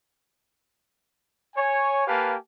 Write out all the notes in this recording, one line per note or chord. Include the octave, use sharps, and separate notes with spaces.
C#5 G#5
A#3 G4 B4 F5 G#5 A5